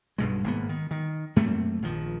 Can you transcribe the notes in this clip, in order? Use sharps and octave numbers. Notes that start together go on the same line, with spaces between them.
B1 G2 B2 G#3
G#1 A#3 B3
D#3
D#3
F#2 A3 A#3 C4
A#1 D#3 F3